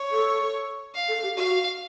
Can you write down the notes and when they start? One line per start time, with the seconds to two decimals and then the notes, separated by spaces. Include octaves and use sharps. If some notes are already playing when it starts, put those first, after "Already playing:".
Already playing: C#5
0.11 A4
0.95 F5
1.08 A4
1.23 G4
1.37 F#4 F5